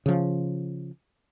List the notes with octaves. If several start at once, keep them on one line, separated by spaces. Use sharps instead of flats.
C#3 F3